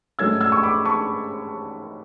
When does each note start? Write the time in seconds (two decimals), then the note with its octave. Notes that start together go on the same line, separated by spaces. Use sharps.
0.19 G#2 F#3 A3 C#4 E6 G#6
0.41 E6 G#6
0.52 C#6
0.63 B5 D6
0.85 A5 C#6